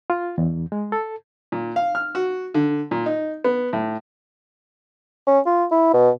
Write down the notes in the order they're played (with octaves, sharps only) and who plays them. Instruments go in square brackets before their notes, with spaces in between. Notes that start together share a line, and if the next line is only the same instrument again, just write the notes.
[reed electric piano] F4
E2
G#3
A4
[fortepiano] A#2
F5
F6
F#4
D3
A#2
D#4
B3
A2
[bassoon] C#4
F4
E4
B2